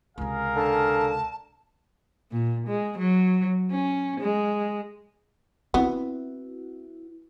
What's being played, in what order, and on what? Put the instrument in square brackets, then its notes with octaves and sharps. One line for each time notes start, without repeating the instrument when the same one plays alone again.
[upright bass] C#2 C3 [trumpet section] G#4 A#4 F5
[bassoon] D3 [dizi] A5
[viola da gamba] A#2
G#3
F#3
C#4
G#3
[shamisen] B3 [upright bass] C4 [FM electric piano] E4 F#4